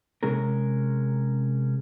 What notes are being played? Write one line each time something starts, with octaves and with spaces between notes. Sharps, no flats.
C3 G#3 C#4 G#4 A#4